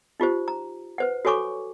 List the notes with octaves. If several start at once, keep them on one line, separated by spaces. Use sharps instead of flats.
D#4 F4 G4 C5
A#5
B4 C5 F#5
F#4 A4 C#5 G#5 C#6 D6